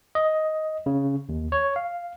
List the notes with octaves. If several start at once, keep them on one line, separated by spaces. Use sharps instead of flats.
D#5
C#3
D#2
C#5
F5